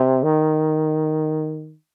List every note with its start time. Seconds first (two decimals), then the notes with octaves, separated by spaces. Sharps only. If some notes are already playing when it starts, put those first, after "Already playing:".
Already playing: C3
0.23 D#3